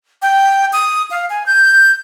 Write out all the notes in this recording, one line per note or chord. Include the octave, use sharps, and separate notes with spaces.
G5
D#6
F5
G#5
G6